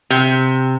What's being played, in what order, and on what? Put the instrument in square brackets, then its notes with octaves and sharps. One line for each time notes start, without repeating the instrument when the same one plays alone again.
[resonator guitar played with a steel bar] C3